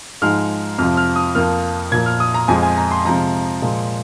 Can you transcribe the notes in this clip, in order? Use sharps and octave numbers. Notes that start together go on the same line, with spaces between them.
G#2 F3 G#3 F6
F2 C3 F3 F6
F6
D#6
F2 F3 A#3 F6
A#2 F3 A#3 G#6
F6
D#6
A#5
F2 F3 G#3 G#5
G#5
A#5
C6
C3 F3 G#3 A#5
A#2 F3 G#3